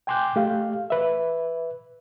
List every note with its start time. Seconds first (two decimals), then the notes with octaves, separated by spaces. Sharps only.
0.07 G5 G#5 C6 D6 F#6 G6
0.36 A3 G4 F5
0.90 B4 E5